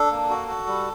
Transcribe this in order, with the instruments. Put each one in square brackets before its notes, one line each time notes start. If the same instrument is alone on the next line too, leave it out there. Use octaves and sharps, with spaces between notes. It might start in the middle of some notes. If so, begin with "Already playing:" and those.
Already playing: [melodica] D4 A4
A#3
F#4
F#4
G3